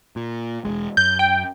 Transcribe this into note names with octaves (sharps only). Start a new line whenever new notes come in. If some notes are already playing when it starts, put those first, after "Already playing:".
A#2
E1 D#2 G#3
F#2 G6
G5